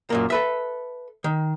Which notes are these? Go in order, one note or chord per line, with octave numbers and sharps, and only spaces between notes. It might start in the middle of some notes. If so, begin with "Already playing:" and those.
F#2 A#2 A#3
A4 B4 E5
D#3